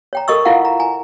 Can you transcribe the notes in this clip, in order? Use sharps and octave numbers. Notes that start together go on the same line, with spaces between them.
C#5 G5 A#5
A4 A#4 D#5 C#6 E6
E4 F4 A4 F5 F#5
A#5
G#5 A#5